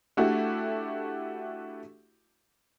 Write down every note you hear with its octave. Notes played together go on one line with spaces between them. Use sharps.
A3 D4 E4 F#4 G4 A4